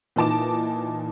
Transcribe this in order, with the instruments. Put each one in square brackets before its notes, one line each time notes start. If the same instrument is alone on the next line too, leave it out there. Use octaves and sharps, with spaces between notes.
[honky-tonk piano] A#2 E3 D#4 A5 D6 E7